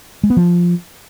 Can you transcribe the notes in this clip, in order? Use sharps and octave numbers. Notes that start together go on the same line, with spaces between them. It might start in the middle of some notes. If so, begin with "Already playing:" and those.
G#3
B3
F3